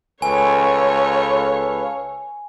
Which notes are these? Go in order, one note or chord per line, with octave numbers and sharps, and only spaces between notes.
C#2 A4 B4 C#5 F5 G#5